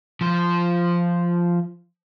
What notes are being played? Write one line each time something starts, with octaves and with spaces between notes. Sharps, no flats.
F3 C5